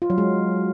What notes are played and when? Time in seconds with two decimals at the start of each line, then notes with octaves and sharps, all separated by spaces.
0.02 F4
0.10 F#3
0.18 G#3